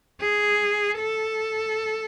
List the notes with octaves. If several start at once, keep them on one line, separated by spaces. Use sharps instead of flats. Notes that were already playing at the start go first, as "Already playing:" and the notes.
G#4
A4